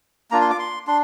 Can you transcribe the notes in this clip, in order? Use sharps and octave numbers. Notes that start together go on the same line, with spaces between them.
A#3 D4 F4 A#5
C6
D6
C6
D4 C6